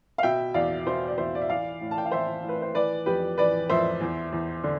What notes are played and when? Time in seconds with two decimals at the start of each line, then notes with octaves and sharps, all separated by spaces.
0.18 F5
0.23 B2 E5 G5
0.54 E2 D5 F5
0.86 B2 C5 E5
1.08 D5
1.18 E2 C5 E5
1.35 D5
1.42 E5
1.49 E3 D5 F5
1.81 A2
1.91 A5
1.98 G5
2.05 F5
2.11 E3 C5 E5
2.43 A2
2.49 B4
2.62 C5
2.75 E3 B4 D5
3.06 F2 G4 B4
3.38 E3 B4 D5
3.69 F2 C5 E5
4.00 E2
4.32 E2
4.64 D3